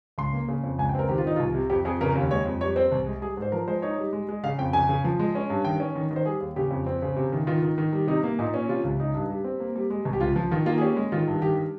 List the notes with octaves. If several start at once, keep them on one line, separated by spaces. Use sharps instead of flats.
C#2 C6
A#3
C#3
F2
C#2 G#5
G5
C4 A#4
D#3 G4
F4
D#3 D#4
C2 F4
C3
F2 G4
F2 G#4
C#3 A#4
D#2
G#3 C#5
F2
G3 C#5
C4 C5
C2
G#3
G3 G#4
G#2
C5
F3 A#4
G#3 C5
D#4 C#5
G3
G#3
G#3
C#3 F5
F2 G5
C#3 G#5
C#3
F3
G#3
C#4
G2
D#3 G5
C#4
D#3
D#3
C5
G3 G#4
D#2
C#3 G4
F2
C4
C#3
C3
D#3
D#3 F4
D#3
D#3
G3
C3 D#4
A#3
A#2 D#4
C#4
C3 F4
C#2
D#4
G2
G3
C4
A#3
G3
G#3
C2
G4
C#2 F4
F3
D#3 F4
A#3 F4
G#4
C#4 G4
G#3
D#3 F4
G2
D#3 G4
G3